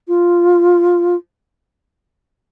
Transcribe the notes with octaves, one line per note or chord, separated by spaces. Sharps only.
F4